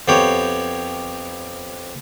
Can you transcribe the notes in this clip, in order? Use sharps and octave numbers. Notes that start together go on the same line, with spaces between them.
F2 B3 G4 C#5